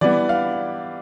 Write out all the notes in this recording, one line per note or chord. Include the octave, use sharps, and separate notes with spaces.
E3 G3 B3 D5
F5